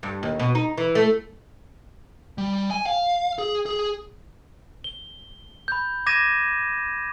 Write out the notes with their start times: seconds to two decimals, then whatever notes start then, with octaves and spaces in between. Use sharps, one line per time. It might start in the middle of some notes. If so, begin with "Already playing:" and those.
0.03 G2
0.23 D#2
0.40 B2
0.55 D#4
0.78 E3
0.95 A3
2.38 G3
2.71 G#5
2.86 F5
3.38 G#4
3.66 G#4
4.84 G7
5.68 B5 G6
6.06 D6 G#6 A#6 D#7 E7